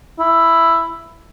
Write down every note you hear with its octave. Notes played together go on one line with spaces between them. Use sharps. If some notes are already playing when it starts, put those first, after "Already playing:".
E4